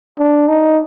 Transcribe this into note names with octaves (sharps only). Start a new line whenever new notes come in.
D4
D#4